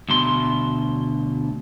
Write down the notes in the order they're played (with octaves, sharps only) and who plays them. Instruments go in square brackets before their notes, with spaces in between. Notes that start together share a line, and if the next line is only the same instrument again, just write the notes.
[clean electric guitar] D2 B2 C6